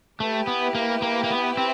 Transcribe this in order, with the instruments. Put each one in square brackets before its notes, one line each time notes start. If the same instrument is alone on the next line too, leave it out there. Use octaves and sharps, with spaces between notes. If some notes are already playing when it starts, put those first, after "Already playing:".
[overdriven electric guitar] A3 [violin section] E4 G4 B4
[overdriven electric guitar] B3
A#3
A#3
A#3
B3
C4